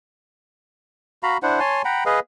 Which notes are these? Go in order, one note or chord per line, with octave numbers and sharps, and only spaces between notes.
F#4 F5 A#5 B5
D4 E4 C5 F#5
C#5 G#5 A5 C6
F#5 G5 A#5 B5
G#4 B4 D#5 F5